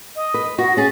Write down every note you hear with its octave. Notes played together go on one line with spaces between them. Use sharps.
D#5
B4
F#4 A#6
C#4 G#4 A6